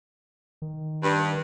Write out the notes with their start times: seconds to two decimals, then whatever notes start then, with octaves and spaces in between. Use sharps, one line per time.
0.62 D#3
1.04 G2